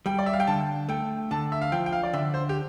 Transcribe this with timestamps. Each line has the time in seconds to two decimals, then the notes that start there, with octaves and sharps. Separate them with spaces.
0.06 G3 G5
0.19 D5
0.26 E5
0.33 F5
0.40 G5
0.47 D3 A5
0.89 A3 G5
1.31 D3 A5
1.52 E5
1.62 F5
1.72 F3 G5
1.86 G5
1.93 F5
2.03 D5
2.13 D3 E5
2.34 C5
2.49 G4